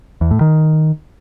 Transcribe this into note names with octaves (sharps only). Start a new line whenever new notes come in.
E2
A2
D#3